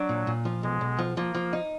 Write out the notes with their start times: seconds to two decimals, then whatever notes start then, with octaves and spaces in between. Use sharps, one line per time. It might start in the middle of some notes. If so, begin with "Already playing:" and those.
Already playing: F#3 D4
0.09 A#2
0.27 A#2
0.45 F3
0.63 B1 G#3
0.81 B1
0.99 F3
1.17 F3 A#3
1.35 F3
1.53 D#4